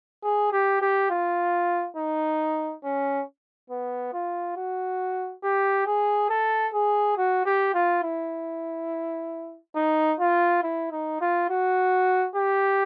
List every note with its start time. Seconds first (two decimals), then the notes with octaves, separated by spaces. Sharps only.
0.23 G#4
0.52 G4
0.81 G4
1.10 F4
1.96 D#4
2.84 C#4
3.70 B3
4.13 F4
4.56 F#4
5.43 G4
5.86 G#4
6.30 A4
6.73 G#4
7.17 F#4
7.46 G4
7.74 F4
8.03 E4
9.76 D#4
10.20 F4
10.63 E4
10.92 D#4
11.21 F4
11.50 F#4
12.36 G4